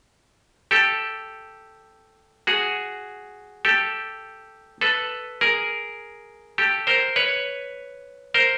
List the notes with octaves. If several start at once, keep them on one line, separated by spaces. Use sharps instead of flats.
G4 A4
F#4 G#4
G4 A4
A4 B4
G#4 A#4
G4 A4
A#4 C5
B4 C#5
A#4 C5